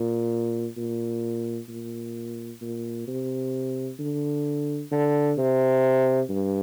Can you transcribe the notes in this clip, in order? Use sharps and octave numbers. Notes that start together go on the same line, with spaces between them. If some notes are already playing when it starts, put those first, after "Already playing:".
Already playing: A#2
A#2
A#2
A#2
C3
D3
D3
C3
G2